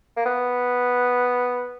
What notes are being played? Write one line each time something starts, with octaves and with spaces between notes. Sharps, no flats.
A#3
B3